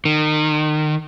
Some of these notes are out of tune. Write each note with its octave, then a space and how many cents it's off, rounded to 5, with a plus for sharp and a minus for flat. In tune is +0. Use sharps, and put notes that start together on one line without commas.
D#3 -30